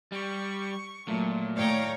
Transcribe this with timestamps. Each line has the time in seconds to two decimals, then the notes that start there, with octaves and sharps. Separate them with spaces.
0.12 G3 C#6
1.08 A#2 F#3 A3
1.56 A2 D#3 C#5 D5 F5 G5 A#5